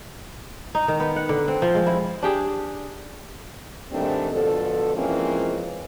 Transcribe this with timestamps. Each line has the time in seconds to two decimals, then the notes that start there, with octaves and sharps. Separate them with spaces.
0.75 D#4
0.88 D#3
1.00 B3
1.16 F#5
1.29 D3
1.48 C4
1.62 F3
1.75 G#3
1.86 E4
2.23 D4 G4 G#4
3.91 G#2 D#3 G3 A3 C4 D4
4.32 B2 D3 F3 A4
4.95 E3 F3 G#3 A#3 C4 C#4